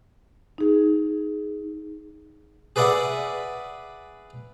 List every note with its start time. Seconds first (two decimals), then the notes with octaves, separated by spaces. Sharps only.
0.58 D#4 G#4
2.76 G#4 B4 D5 E5 F#5